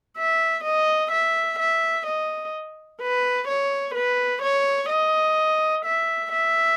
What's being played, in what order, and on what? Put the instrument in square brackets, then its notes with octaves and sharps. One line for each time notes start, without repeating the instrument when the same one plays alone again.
[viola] E5
D#5
E5
E5
D#5
B4
C#5
B4
C#5
D#5
E5
E5